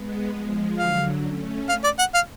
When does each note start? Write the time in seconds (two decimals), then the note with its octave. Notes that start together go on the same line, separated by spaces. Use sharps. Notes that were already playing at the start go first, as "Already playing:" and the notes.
Already playing: G#3 B3
0.34 F3 G#3
0.78 D3 F#3 F5
1.25 A3 C#4
1.69 F5
1.84 D5
1.99 F#5
2.15 F5